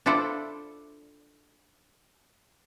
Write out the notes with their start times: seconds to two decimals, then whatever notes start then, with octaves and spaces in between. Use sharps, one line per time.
0.06 D4 E4 F4 A4 C5 D5